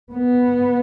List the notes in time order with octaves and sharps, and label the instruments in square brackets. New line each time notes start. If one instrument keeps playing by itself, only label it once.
[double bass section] B3